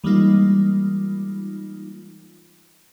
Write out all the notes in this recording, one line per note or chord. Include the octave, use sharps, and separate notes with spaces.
E3 G3 G#3 A#3 D#4 F4